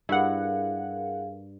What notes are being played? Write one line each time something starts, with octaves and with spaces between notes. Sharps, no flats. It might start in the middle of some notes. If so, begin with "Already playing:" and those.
G2 E4 G#4 A#4 F5 F#5